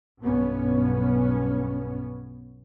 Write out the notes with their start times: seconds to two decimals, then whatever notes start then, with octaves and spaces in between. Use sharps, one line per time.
0.20 B1 G2 B3 C#4